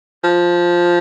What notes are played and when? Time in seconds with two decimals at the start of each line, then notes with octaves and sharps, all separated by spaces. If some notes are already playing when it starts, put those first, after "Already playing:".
0.24 F3